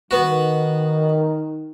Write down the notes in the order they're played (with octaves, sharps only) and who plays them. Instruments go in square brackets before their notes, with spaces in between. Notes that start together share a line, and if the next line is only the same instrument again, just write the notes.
[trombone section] D#3 [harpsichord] B3 F#4